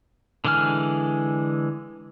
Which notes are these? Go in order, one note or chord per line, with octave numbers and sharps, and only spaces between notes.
D3 E3 G#3 G#5 F6